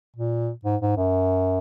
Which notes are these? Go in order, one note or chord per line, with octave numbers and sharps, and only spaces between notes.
A#2
G#2
G#2
F#2